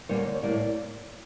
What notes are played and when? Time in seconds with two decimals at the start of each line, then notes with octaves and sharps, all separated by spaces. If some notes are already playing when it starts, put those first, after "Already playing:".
0.09 D3 G3 A#3 C#4 C#5
0.42 A2 G3 A#3 D5